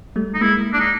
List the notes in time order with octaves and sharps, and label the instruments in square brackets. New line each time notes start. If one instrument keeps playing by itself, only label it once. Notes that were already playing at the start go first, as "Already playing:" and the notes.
[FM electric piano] G3 A3
[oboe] D#4
[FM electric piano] G#3 A#3 [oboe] E4
[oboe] D4
D#4